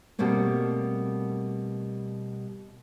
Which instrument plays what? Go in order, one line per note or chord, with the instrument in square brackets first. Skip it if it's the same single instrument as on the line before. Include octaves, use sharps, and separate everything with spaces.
[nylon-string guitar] B2 G3 A3 A#3 C4